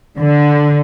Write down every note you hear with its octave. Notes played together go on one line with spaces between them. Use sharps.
D3